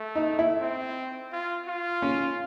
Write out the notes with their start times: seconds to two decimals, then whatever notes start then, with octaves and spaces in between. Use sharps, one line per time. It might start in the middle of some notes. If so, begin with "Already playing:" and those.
Already playing: A3
0.15 D#4
0.39 E4
0.61 C4
1.32 F4
1.68 F4
2.02 C#4